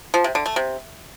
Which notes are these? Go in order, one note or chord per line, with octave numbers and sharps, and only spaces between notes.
F3
C3
D3
A3
C3